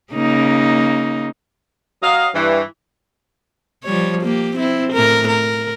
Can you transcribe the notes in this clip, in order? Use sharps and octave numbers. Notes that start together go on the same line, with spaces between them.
C#3 A#3 D#4
F#3 D#5 F5
G2 E3
F3 G3 C#5
A#3 G4
C4 E4
A2 A#4
A#4